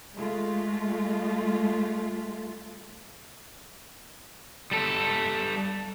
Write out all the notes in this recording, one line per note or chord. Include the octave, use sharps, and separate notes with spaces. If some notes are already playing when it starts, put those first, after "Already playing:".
G#3 A3 F4
G3 A4